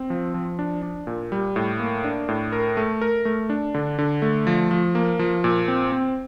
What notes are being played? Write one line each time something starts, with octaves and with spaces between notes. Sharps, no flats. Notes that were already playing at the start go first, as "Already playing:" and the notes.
Already playing: C4
F3
F3
D4
D4
A#2
G3
A2
A#3
D4
A2
A#4
A3
A#4
A3
D4
D3
D3
A3
F3
F3
A#3
F3
A#2
C4
C4